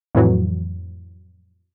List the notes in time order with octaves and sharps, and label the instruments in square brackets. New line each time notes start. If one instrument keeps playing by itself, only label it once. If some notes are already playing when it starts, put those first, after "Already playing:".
[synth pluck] F2 A2 E3 F#3